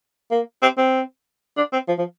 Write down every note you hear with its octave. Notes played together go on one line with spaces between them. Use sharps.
A#3
C4
C4
D4
C4
F3
F3